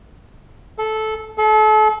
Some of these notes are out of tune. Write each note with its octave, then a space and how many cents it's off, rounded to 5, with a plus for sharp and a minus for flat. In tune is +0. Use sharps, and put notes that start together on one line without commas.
A4 -15
A4 -35